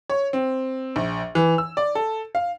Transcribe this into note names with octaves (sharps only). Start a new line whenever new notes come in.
C#5
C4
A#1
E3
E6
D5
A4
F5